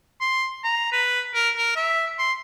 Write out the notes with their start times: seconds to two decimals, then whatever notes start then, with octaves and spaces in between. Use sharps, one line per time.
0.21 C6
0.64 A#5
0.92 B4
1.34 A#4
1.57 A#4
1.76 E5
2.19 C6